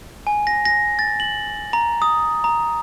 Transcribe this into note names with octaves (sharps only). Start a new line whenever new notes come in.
G#5
A#6
A#6
A6
F#7
A#5
D#6
A#5